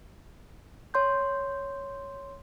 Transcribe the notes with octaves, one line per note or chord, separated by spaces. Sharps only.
C#5 C6 G6